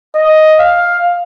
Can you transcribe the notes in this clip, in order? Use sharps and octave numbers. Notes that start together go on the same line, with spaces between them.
D#5
F5